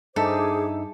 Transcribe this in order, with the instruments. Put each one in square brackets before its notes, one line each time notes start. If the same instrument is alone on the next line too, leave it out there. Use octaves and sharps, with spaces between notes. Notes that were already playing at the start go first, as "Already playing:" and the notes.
[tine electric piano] G2 D#4 E5 [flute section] G#4 C5 D6 [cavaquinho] A4